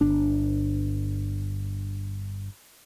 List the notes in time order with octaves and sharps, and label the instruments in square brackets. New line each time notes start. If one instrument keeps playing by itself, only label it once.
[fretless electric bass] G1 D4